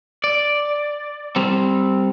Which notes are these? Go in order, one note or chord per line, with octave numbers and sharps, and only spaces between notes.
D5
G3 C4